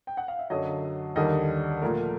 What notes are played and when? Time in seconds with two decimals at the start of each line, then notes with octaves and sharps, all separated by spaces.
0.07 G5
0.17 F#5
0.28 F5
0.39 E5
0.50 F#2 D3 F#3 D#5
1.16 D#2 D3 G3 A#3 D#5
1.82 A#2 F3 A3 A#4